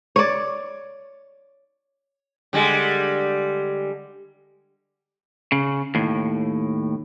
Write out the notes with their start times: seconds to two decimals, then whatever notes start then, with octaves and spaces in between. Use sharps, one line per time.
0.16 C#5 D5
2.53 D3 G3 G#3
5.52 C#3
5.95 D#2 A2